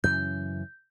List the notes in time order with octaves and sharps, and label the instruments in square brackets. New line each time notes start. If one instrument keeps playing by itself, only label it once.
[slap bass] F#2 C#3 E3 [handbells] G6